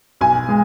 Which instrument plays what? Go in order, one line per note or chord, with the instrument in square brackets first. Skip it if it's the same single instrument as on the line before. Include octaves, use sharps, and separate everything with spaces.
[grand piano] B1 G#5
G#3